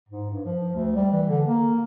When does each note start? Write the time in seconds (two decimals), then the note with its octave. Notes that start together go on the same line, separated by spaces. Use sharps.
0.09 G#2
0.30 G2
0.46 F3
0.75 D2
0.96 G3
1.12 E3
1.29 D3
1.47 A#3